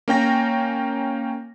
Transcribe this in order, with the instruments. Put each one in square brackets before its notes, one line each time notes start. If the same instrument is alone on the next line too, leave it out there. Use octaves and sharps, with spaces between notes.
[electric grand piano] A#3 C#4 G5 A#6